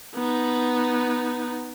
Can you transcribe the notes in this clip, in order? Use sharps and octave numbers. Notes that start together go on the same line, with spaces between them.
B3 D#4